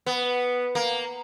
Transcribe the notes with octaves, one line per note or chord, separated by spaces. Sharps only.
B3
A#3